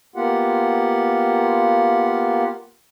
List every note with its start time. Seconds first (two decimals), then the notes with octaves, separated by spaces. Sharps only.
0.16 A#3 B3 F4 G4 F#5